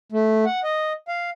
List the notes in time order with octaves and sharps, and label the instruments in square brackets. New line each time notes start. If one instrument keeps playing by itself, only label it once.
[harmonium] A3
F#5
D#5
F5